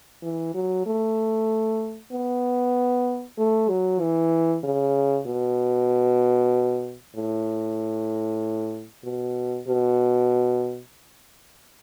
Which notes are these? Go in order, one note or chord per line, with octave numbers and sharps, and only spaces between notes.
E3
F#3
A3
B3
A3
F#3
E3
C#3
B2
A2
B2
B2